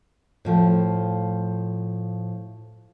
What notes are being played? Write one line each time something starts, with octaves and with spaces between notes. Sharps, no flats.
A2 F3 A3